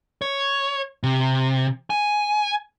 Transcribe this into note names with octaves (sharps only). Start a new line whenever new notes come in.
C#5
C3
G#5